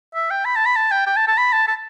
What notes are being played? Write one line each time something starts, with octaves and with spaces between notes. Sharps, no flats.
E5
G5
B5
A5
B5
A5
G5
G5
A5
A5
B5
A5
A5